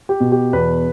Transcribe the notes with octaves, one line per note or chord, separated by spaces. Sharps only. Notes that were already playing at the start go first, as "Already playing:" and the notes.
G4
B2
G4
E2 B4